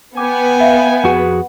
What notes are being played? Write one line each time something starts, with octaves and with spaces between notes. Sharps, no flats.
B3 G5 G#5 D6
E5 F5
F2 F#4 G#4 F#5